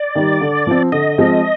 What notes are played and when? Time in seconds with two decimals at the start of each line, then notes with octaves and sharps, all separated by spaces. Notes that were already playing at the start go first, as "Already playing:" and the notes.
Already playing: D5
0.15 D#3 G3
0.41 D3
0.67 F3 C4
0.92 D3 D#5
1.18 F3 G#3 C4